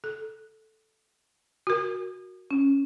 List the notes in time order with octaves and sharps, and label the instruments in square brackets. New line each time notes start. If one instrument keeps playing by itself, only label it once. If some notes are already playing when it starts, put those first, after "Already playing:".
[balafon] A4
F#4 A#4
[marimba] C#4